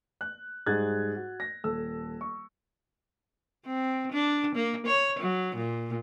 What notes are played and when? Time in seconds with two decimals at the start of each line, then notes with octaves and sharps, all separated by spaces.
0.21 F#6
0.66 G#2 G3 G#4 F#6 G#6 A6
1.16 F#4
1.40 A#6
1.64 D#1 A4 E6
2.21 C#6
3.66 C4
4.12 D4
4.55 A#3
4.87 C#5
5.19 F#3
5.56 A#2